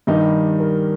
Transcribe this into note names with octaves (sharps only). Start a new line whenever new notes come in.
G2 D#3 G3 D#4
A#4